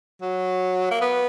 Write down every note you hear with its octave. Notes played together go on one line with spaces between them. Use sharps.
F#3
A#3
B3